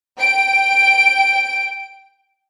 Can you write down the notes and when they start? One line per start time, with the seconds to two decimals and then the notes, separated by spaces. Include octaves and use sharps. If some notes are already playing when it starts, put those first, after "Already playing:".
0.17 G5 D7